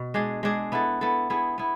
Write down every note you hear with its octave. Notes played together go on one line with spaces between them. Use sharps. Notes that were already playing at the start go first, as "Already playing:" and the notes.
Already playing: B2
G#3 D4 G#4
G#3 D4 G#4
B3 E4 A4
B3 E4 A4
B3 E4 G#4
B3 E4